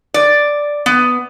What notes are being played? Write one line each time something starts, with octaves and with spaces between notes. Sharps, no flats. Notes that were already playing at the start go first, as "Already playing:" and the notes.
D5
B3